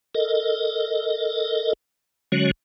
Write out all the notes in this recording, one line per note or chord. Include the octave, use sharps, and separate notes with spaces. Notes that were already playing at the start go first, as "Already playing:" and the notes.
A4 A#4 D#5
D3 F#3 G#3 C#4 F#4 C#5